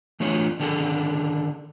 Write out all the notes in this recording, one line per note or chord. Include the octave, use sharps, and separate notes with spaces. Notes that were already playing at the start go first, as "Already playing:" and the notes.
E3 A3 D4 F4 C#5
D3 D#3 D4 G#4 A4